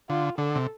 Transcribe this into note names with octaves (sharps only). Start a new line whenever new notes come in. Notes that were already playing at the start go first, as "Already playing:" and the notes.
D3 F4
D3 A4
C3